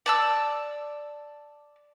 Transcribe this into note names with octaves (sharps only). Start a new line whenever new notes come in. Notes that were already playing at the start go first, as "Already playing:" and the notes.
D5 A5 E6